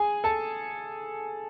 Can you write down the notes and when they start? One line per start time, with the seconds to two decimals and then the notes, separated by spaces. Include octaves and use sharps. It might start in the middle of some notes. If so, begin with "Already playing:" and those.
Already playing: G#4 G#5
0.24 A4 A5